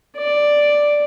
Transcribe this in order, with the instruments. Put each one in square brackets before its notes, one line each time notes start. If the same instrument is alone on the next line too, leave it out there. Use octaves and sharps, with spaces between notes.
[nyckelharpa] D5